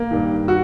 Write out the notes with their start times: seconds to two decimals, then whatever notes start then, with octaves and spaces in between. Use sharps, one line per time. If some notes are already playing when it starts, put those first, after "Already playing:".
Already playing: A#3
0.11 G2 D#3
0.48 F#4